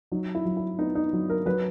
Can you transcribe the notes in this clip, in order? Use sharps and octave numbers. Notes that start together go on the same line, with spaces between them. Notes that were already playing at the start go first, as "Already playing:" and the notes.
F#3 D#4
E4
F#3
E4
B3 D#4
D#4
F#3
A#4
F#3 B4